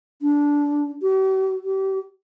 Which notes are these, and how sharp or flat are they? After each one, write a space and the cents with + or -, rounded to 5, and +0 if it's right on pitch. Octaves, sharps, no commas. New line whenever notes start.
D4 -10
G4 -45
G4 -30